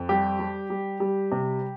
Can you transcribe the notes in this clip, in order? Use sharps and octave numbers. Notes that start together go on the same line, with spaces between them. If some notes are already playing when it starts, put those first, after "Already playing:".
Already playing: F2
G3 G4
G3
G3
G3
C3